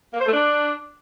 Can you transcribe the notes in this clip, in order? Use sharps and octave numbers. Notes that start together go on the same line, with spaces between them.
A#3
C5
A3
D4